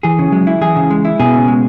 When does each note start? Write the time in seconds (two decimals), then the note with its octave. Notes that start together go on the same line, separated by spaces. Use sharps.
0.03 E3 G#4
0.19 C#3
0.32 F#3 G#3
0.47 E4
0.61 E3 G#4
0.76 C#3
0.90 G#3
1.05 E4
1.20 B2 G#4
1.34 C#3
1.48 G#3